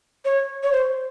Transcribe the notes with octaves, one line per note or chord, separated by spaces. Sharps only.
C#5
C#5
C5